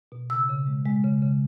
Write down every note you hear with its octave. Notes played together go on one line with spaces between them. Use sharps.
B2
C#3 E6
C#3
G#3
G#3
C#3
C#3